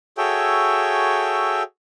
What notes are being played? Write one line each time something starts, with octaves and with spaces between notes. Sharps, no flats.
F#4 G#4 A4 C#5 E5 G5